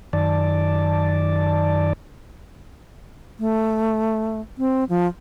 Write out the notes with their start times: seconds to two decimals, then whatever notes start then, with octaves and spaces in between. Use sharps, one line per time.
0.13 F#2 D#3 D5 A5
3.38 A3
4.58 C4
4.89 F3